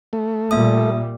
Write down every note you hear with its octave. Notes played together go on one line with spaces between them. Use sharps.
A3
A#2 G3 A#3 E5 D#6